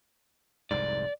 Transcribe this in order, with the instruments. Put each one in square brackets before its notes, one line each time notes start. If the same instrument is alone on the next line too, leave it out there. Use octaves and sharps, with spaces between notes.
[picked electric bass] F1 C2 G#2 [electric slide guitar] D5